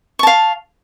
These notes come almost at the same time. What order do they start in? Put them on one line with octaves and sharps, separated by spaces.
C#6 A5 F5